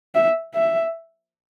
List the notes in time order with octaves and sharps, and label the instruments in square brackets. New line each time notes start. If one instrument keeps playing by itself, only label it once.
[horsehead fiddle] E5
E5